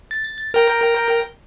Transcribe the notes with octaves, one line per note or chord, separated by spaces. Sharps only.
A6
A#4 G5